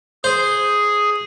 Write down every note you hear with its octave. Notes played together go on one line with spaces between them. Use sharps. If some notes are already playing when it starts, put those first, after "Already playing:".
G#4 C5